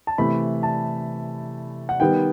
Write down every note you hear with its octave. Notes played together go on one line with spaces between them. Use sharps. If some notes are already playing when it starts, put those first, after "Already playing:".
A5
C3 E3 A3 B5
A5
F#5
D#3 G3 B3 G5